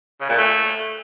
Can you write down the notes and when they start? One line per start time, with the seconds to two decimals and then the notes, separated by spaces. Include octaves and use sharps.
0.21 C#3
0.29 A#2
0.38 A3